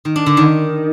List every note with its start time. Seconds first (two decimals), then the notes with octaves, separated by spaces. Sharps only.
0.05 D#3
0.16 D4
0.26 D3
0.37 D#3